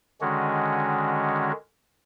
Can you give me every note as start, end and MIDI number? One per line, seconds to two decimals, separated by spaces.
0.21 1.52 50
0.21 1.52 51
0.21 1.52 56
0.21 1.52 61
0.21 1.52 66